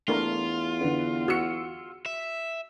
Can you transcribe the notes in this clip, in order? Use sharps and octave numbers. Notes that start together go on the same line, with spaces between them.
E2 A3 D4 F4 A#4
D3 B3
F#4 E6 C#7
E5